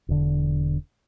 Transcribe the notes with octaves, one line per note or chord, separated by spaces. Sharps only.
E1 D3